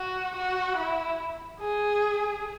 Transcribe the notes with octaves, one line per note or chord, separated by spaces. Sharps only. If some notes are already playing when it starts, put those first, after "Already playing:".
Already playing: F#4
F#4
E4
G#4